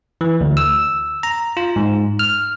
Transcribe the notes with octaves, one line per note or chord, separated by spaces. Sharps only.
E3
D2
E6
A#5
F4
G#2
F6